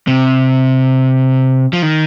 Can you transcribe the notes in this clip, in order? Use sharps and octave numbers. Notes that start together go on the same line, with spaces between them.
C3
F3
D#3